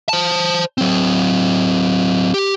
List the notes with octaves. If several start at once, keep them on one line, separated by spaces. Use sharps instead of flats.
C5 A5
F#3 C4
G4